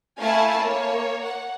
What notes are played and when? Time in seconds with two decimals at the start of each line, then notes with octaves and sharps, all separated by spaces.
0.19 A3 E4 F5 G#5 A5
0.60 A#3 C#5
1.23 F#5